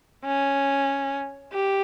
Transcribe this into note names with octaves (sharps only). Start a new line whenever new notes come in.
C#4
G4